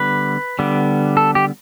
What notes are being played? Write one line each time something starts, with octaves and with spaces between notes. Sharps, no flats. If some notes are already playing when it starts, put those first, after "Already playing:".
Already playing: D3 G3 B3 B4
D3 G3 B3
A4
G4